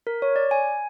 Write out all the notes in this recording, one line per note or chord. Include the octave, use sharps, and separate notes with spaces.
A#4
C#5
D5
G#5